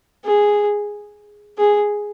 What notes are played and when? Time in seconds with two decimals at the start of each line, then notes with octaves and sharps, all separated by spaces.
0.25 G#4
1.58 G#4